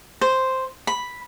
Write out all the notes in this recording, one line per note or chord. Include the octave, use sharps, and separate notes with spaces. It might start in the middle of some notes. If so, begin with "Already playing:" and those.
C5
B5